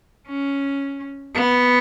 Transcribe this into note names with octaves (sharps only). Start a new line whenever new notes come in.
C#4
B3